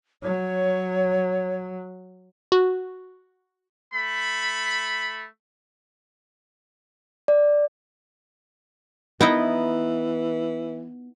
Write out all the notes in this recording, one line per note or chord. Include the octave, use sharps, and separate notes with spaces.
F#3 C#5
F#4
A3 B5
D5
E3 B3 D#4 E4 D#5